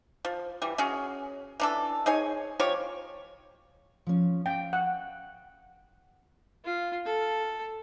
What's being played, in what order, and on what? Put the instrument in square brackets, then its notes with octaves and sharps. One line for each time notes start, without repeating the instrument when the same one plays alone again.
[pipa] F3
E3 G3
C#4 F#4 G#4
E3 D4 A4
D#4 G#4 C#5 G#5
F3 G4 C#5 C#6
[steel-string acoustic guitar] F3 C#4
[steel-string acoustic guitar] F5 [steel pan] G5
[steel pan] F#5
[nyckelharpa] F4
A4